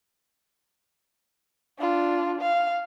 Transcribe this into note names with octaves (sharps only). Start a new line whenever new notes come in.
D4 F4
F5